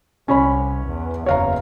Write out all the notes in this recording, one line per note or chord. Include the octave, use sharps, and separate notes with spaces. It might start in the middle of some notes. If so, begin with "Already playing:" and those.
C2 C#4 C#5 B5
E2
F#1 E2 C#5 F5 A#5